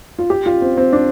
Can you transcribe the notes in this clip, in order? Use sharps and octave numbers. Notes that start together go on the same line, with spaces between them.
F4
G4
F4
C4
C4
D4